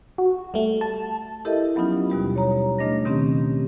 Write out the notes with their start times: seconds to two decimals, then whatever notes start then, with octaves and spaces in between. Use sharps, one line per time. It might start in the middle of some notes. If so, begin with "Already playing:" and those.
0.18 F#4
0.54 G3 A3
0.81 A5
1.45 E4 G4 A4 A#4 D#5 E5
1.75 F3 F#3 B3 C#4 D#4 F4
2.10 D#2 B2 G3 G4
2.36 C#5 A#5
2.79 C#3 A3 D4 D#5 A#6
3.05 B2 D#3 C4 C#4 G4